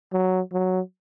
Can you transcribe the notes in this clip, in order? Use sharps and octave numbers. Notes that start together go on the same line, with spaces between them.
F#3
F#3